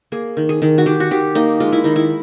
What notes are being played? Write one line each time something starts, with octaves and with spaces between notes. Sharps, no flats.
A#3 G#4
D#3
G#4
D#3
F#4
D#3 G4
F#4
D#3 G4
A#3 D#4
G#3 F4
E4
D#3 D#4
E4